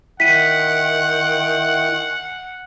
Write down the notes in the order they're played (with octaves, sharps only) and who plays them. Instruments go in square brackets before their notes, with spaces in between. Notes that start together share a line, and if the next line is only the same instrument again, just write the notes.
[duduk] D#3 [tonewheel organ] E4 G5 [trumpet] F#5 [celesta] B6 D#7